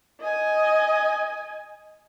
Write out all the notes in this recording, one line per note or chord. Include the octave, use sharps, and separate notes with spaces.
D#5 G#5